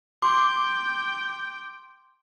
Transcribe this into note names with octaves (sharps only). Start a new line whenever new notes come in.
G5 C6 D6 G6